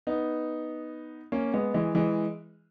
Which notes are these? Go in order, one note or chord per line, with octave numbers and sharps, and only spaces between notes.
B3 D#4
A#3 C#4
G#3 B3
E3 G#3
E3 G#3